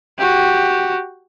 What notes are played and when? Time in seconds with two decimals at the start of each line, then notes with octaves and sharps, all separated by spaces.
0.19 F#4 G4